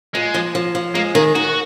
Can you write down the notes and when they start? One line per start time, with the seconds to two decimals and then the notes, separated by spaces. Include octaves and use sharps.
0.14 A#2 G#3
0.34 F3
0.55 F3
0.75 F3
0.95 G#3 A#3
1.15 D#3 G#4
1.35 D#3 F#4